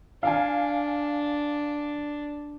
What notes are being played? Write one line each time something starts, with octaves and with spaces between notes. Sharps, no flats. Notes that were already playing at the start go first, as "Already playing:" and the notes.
D4 F5 G#5